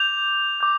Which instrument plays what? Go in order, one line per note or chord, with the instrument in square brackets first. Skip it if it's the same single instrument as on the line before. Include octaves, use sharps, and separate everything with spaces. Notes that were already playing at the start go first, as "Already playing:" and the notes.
Already playing: [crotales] D6 G6 F7
D6 G6